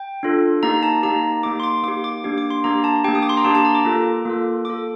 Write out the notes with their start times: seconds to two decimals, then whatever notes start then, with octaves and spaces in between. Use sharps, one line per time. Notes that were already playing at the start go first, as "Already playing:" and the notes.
Already playing: G5
0.23 D4 F4 A4
0.63 A#3 D#4 G4 A#5
0.83 A5
1.03 A#3 D#4 G4 A#5
1.43 A#3 D#4 G4 D6
1.60 C6
1.63 D6
1.83 A#3 D#4 G4 D6
2.04 D6
2.24 A#3 D4 G4
2.38 D6
2.51 C6
2.64 A#3 D4 G4 A#5
2.84 A5
3.04 A#3 D4 G4 G5
3.15 D#6
3.22 D6
3.29 C6
3.37 A#5
3.45 A#3 D4 G4 A5
3.55 A5
3.65 A#5
3.75 D6
3.85 A#3 F4 A4
4.25 A#3 F4 A4
4.65 A#3 F4 A4 D6